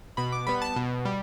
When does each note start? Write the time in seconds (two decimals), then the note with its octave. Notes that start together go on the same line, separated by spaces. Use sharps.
0.17 B2 B5
0.32 D6
0.47 G3 B3 B5
0.62 A5
0.76 B2
1.05 G3